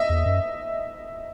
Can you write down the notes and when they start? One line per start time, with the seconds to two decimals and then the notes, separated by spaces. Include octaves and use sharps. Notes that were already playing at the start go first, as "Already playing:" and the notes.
Already playing: D#5 E5
0.10 E2
0.26 F#2